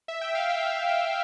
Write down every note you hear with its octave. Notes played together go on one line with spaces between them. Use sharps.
E5
G5
F5
G5
G5
G5